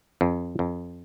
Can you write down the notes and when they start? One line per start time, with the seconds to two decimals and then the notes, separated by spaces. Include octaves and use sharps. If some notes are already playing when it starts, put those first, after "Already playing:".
0.21 F2
0.59 F2